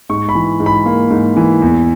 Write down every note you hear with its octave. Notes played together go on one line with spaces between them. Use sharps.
G#2 C#6
B5
E3
G#2
B5
A#3
G#2
E3
E2